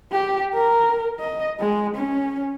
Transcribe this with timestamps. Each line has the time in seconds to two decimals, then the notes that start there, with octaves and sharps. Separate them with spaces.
0.11 G4
0.54 A#4
1.20 D#5
1.60 G#3
1.96 C#4